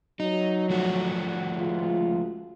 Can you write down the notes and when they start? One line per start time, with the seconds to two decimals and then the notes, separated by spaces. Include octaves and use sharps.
0.20 F#3 D#4
0.70 F3 A3 F#4
1.56 C#2 G#3 F4